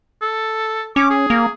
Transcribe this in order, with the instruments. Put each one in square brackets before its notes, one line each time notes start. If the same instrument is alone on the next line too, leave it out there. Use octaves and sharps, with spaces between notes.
[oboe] A4
[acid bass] C#4 [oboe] D6
[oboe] G#4
[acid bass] A#3